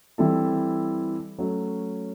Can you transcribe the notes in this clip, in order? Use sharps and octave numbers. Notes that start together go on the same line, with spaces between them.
E3 G3 C4 E4 A4
F#3 A3 C#4